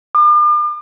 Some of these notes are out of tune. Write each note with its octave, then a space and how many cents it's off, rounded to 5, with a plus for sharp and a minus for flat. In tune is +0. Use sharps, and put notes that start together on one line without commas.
D6 +40